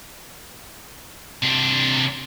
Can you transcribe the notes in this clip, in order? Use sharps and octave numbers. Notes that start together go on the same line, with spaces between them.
C3 D4